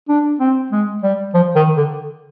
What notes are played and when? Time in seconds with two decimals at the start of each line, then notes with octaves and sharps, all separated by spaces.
0.09 D4
0.40 C4
0.72 G#3
1.03 G3
1.35 F3
1.56 D#3
1.77 D3